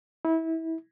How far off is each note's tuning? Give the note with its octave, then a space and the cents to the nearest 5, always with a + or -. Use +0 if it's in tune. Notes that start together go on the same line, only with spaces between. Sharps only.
E4 -25